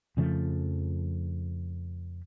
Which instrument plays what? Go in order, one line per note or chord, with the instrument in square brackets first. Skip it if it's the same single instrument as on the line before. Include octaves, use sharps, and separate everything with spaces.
[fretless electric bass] F2 C#3 F3 A3